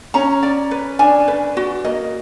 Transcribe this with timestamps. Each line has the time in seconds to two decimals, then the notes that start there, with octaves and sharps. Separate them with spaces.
0.14 C#4 A#5
0.43 D5
0.71 B4
0.99 D4 G#5
1.28 B4
1.57 F#4
1.85 A#3 D#5